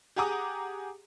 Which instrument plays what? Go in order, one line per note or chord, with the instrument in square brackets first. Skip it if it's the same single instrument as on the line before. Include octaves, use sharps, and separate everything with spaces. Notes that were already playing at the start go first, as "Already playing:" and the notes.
[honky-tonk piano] G4 G#4 F#5 A#5 D6 D#6